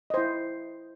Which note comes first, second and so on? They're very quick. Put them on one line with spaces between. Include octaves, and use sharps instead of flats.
D#5 C5 E4